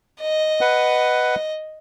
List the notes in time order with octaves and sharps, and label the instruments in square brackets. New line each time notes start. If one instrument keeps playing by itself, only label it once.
[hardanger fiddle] D#5
[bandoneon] B4 F#5